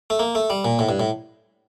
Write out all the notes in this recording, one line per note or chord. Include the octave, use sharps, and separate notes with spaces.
A3
A#3
A3
G3
A#2
A2
G2
A2